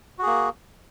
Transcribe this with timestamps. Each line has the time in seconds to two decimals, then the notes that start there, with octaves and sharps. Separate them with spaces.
0.19 F#4
0.22 G#4
0.26 A#3